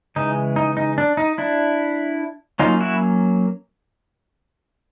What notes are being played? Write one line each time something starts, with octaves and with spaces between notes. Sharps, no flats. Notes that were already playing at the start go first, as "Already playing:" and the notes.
C#3 E3 G#3 D#4
D#4
D#4
D4
D#4
D4 E4
F#3 A#3 C#4 D#4 F4
E4 F#4